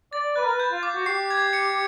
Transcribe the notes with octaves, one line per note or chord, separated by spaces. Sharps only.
D5 A6
B4 F#6
A#4
B4
G6
F4
D6
F#4
G4 C7
G#6
C#7